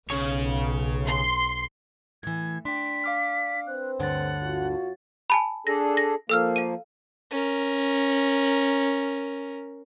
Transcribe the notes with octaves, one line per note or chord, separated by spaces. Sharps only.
B1 C#3 C#5
C6
A2 E3 G#6
D4 G5 C6 B6
F5 D6 F6
C4 B4 C5 F#6
D2 G2 D3 C#5 F#5 A6
F#2 F4 F#4
G#5 A5 B5
D4 G#4 A4 A#6
A#6
F3 A#3 A4 E6 F6
F5 D#7
C#4 A#4